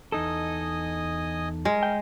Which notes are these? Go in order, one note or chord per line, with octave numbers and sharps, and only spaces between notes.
E2 D#4 A4 D#5 G#5 D#6
G#3 A#4
G5